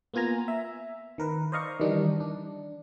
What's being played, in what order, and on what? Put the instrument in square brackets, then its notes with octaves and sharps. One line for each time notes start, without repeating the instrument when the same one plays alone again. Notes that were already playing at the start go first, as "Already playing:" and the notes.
[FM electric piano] A#3 B3 F4 G#5 A#5
E5
D#3 A#4 B4
C5 D5 D#5 F5 A#5 C#6
D#3 E3 G3 D4 D#4
D4